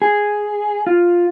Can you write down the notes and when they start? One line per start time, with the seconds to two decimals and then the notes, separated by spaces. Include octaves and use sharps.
0.02 G#4
0.87 F4